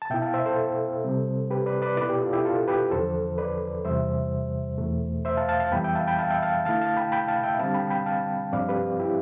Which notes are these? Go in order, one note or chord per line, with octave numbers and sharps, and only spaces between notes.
A5
B2 B3 E4 E5 G5
F5 A5
C5 E5
A4 C5
C3 G3 C4
G4 B4
B4 D5
B4 D5
B2 B3 E4 B4 D5
G4 B4
F4 A4
E4 G4
F4 A4
G4 B4
E2 D3 F3 A4 C5
B4 D5
E2 C3 G3 C5 E5
E2 B2 A3
C5 E5
F5 A5
F5 A5
F5 A5
F2 E3 G3 B3 G5 B5
E5 G5
F5 A5
G5 B5
F5 A5
E5 G5
F5 A5
D3 A3 E4 F5 A5
F5 A5
G5 B5
G5 B5
F5 A5
E5 G5
D3 G3 C4 F5 A5
G5 B5
G5 B5
F5 A5
G2 F3 C4 D5 F5
G4 B4
E4 G4